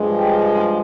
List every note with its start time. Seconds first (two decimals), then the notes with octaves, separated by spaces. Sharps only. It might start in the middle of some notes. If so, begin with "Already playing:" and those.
Already playing: G2 F3 G#3
0.18 G4